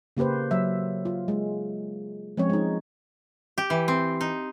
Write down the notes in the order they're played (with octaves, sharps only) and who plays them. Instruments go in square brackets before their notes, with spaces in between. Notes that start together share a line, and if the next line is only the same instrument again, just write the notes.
[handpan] C#3 A#3 G4 B4 C5
F#3 E5
F4
G#3
F3 G#3 C4 C#4 C#5
G#3 D#4
[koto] G4
E3
C4
D#4